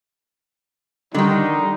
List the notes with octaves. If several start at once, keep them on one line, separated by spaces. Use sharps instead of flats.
D3 D#3 G3 D#4